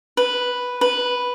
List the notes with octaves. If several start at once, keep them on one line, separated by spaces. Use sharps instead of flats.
B4
B4